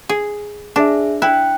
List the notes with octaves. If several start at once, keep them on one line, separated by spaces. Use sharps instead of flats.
G#4
D4 G#4 E5
E4 G5 F#6